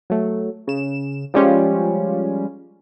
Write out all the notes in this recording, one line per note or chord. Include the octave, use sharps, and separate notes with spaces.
F#3 A3
C#3 E7
F3 G3 G#3 C#4 F4 G4